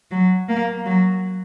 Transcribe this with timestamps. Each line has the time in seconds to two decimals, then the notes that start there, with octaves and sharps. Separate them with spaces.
0.11 F#3
0.49 A#3
0.85 F#3